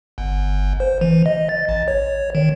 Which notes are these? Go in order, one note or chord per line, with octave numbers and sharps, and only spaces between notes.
G1
C5
E3
D#5
A6
A1
C#5
D#3